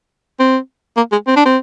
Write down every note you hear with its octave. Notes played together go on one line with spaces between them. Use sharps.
C4
A#3
G#3
C4
D4
C4